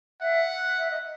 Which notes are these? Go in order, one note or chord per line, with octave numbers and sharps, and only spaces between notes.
E5 F#5
E5
D#5